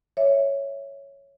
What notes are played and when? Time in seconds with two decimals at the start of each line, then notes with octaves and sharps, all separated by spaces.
0.17 C#5 E5